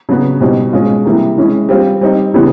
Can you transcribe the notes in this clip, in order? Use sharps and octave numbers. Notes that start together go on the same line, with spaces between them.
C#3 F#3 B3 D4 F#4
B2 G3 C4 D#4 F#4
B2 G#3 C#4 F4
C3 E3 G3 A#3
E3 G#3 C#4
G3 C4 F4
G3 C4 D#4
C#3 E3 G3 B3